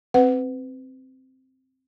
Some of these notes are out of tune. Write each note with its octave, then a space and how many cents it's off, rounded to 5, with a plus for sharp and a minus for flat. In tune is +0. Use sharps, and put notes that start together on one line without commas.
C4 +0 B4 +25 F#5 +0